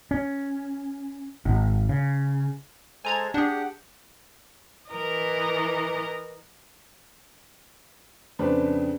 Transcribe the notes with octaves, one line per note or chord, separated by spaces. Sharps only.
C#4
G#1
C#3
G#3 A4 C5 G#5 A#5 G#6
D4 G4 G#4 F#5
E3 A#4 D#5
F2 C#3 D4 B4 C5 D5